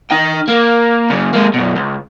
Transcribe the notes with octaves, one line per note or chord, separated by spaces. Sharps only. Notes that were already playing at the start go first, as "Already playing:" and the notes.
D#4 G5
A#3
F#2 C#3
G#3 A#3
F#2 B2
C#2